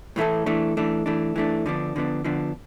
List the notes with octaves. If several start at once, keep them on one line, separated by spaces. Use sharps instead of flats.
A2 E3 A3 E4 A4
E3 A3 D4
E3 A3 D4
E3 A3 D4
E3 A3 D4
D3 F3 B3 D4
D3 F3 B3 D4
D3 F3 B3 D4